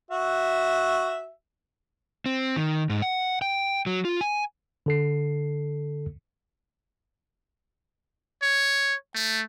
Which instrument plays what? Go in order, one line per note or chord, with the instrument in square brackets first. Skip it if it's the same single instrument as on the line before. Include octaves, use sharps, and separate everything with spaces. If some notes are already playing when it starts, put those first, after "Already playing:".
[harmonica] F#4 E5
[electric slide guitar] C4
D#3
G#2
F#5
G5
F#3
F4
G#5
[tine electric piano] D3 A4 C7
[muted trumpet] C#5
A3